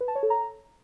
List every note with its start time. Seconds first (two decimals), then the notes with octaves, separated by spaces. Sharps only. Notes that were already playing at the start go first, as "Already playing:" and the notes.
0.01 B4
0.08 A5
0.15 C#5
0.23 A4
0.30 A#5